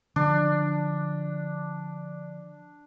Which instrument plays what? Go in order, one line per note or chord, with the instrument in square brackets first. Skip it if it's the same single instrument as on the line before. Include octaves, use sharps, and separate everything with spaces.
[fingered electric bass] D3 F3 [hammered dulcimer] D4